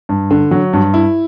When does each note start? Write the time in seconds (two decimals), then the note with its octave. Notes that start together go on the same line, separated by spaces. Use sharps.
0.09 G2
0.31 D3
0.51 F#3
0.73 G2
0.94 E4